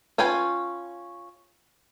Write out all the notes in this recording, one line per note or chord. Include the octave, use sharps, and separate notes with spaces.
C#4 F4 B4 G5 G#5